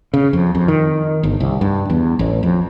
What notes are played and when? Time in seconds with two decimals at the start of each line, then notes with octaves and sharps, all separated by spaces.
0.14 C#3
0.33 F2
0.55 F2
0.68 D#3
1.23 G1
1.40 C2
1.61 G2
1.90 E2
2.19 A1
2.43 F2